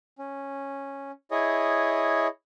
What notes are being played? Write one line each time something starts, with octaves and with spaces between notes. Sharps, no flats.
C#4
E4 G#4 C#5 D#5